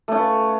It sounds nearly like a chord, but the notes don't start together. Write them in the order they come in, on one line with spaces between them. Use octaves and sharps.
A3 C#4 F4 B4